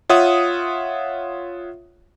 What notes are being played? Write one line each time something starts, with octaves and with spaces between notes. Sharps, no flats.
F4 C#5 E5 F#5 D#6